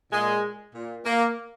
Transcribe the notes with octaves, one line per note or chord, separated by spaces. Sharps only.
A#2 G#3
A#2
A#3